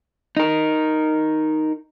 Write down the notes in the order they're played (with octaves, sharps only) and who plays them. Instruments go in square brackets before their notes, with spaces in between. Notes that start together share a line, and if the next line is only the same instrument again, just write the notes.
[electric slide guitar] D#4 A#4